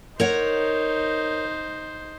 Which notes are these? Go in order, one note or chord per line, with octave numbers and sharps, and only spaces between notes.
D#4 A#4 C5 C#5 F#5